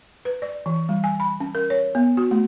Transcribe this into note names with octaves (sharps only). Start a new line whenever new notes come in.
B4
D5
E3
G3
G#5
B5
C#4
A#4
C#5
B3
F#4
A3